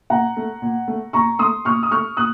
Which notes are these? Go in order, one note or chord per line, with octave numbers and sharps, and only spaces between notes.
A#2 F#5 A#5
A3
A#2
A3
A#2 A#5 C#6
A3 C6 D#6
A#2 C#6 F6
D#6
A3 C#6 F6
A#2 D#6 F#6